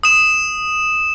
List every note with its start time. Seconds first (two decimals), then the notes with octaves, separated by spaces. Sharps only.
0.03 D#6 E7